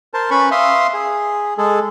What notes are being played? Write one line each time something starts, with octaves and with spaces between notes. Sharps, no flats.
A#4 C5 A5
C#4 B4 B5 C#6
E5 F5 C6 D#6
G#4
G#3 G#4 A4